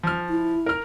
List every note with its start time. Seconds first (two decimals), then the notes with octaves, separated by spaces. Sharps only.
0.03 F3 F6
0.30 E4
0.66 A#4 F6